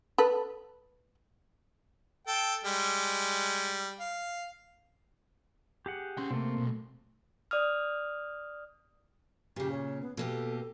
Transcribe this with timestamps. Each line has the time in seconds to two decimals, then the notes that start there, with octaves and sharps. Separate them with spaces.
0.18 A4 B4
2.27 A4 G5
2.65 G3 G#3
4.00 F5
5.86 G4 G#4 F#5
6.18 C#4 C6
6.31 C3 A3 A#3 C4
6.57 B1
7.51 D5 D#6 F6
9.56 A#2 C#3 G4
9.72 C#5
10.01 B3
10.17 B2 A#3 G4 A4